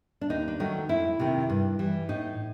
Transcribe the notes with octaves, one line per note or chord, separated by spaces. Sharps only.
D4
D#2 D#4
D4
D#3 F#3 A3 D#4
F2 E4
C3 D#3
G2
E3 G3
A2 D#4